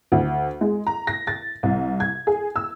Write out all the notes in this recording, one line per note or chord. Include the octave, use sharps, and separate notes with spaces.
D2
G#3
A#5
A#6
A6
C2
G#6
G#4
E6